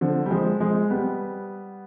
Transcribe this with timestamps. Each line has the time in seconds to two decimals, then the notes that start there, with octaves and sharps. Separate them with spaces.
0.01 D3 F3
0.26 G3
0.31 F3 G#3
0.60 F3 G#3
0.90 G3 B3